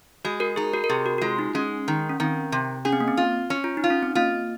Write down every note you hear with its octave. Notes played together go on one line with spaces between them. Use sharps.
G#3 F#4
F#4 A#4
D#4 G#4
F#4 A#4
A#4
C3 G#4
F#4
F#4
G#3 F4
D#4
G#3 C#4
D#3
C#4
D#3 C4
C3
C#4 G#4
C4
A#3
C4
F4
C#4
F4
D#4
F4
C#4
C4
A#3 F4